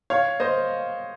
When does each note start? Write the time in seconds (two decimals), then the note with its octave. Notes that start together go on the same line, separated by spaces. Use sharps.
0.10 C#5 F5
0.40 C5 D#5